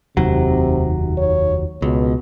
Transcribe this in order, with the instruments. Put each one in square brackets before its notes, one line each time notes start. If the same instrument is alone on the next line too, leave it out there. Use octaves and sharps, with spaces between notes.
[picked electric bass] F1 D#2 F#3 [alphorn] C3
[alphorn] C#5
[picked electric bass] C#2 [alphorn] B2